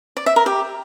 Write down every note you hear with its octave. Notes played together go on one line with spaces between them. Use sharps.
D5
E5
A#4
G4